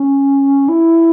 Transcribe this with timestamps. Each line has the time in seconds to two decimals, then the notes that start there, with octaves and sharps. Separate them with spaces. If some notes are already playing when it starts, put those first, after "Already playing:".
Already playing: C#4
0.69 E4